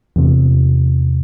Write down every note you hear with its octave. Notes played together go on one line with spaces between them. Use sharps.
E2 C3